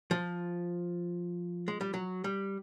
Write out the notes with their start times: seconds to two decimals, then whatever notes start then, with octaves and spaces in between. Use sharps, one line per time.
0.11 F3
1.68 G#3
1.81 G3
1.94 F#3
2.24 G3